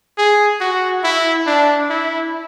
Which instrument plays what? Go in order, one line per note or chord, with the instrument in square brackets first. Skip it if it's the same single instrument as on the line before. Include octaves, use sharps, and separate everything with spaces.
[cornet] G#4
F#4
E4
D4
E4